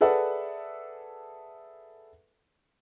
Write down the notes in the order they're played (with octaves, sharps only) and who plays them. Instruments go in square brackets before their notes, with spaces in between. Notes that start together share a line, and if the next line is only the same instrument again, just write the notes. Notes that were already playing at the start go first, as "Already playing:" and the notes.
[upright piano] G#4 A4 B4 D5 E5 F#5